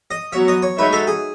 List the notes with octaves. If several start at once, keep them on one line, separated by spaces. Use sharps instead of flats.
D#5
F#3 B3 F#4 C#5 E5
D#5
C#5
G#3 D#4 F#4 B4 C#5 E5
A4
G#4